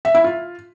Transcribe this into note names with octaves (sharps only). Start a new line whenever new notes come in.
E5
E4
F4